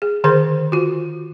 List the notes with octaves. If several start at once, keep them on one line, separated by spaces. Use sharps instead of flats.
G#4
D3 D#3 G#4 A#4 C5
F4 F#4